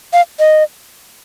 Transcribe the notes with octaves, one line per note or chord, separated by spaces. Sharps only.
F5
D#5